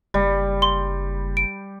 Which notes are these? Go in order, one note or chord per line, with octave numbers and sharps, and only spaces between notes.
F#1 G3
C6 G7
D7